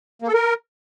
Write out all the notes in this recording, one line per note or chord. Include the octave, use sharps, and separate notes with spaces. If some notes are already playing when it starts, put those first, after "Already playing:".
A#3
A4
A#4